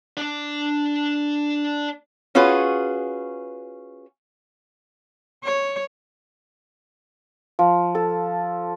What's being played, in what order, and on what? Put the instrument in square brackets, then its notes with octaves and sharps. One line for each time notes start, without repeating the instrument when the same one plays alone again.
[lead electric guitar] D4 D5
[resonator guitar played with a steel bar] C#4 F4 F#4 G#4 B4
[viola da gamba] C#5
[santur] F3
A4